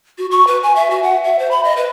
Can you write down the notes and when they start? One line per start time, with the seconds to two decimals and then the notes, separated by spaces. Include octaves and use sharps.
0.18 F#4
0.31 C#6
0.47 B4
0.63 G#5
0.76 E5
0.90 F#4
1.03 F#5
1.24 E5
1.39 C5
1.51 B5
1.64 D#5
1.76 B4